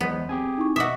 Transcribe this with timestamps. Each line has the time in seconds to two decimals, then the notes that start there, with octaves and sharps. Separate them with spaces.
0.01 E2 F#3 G#3 B3 C5
0.29 C4 G4 G#4 G#5
0.57 D#4 E4 C#6
0.76 B2 F#4 D#5 E5 D6 D#6